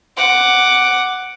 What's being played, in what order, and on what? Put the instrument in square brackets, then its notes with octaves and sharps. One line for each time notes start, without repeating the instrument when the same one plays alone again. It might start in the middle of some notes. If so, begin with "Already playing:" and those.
[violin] F#5 D6